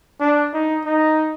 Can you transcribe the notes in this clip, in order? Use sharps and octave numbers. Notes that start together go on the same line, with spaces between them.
D4
D#4
D#4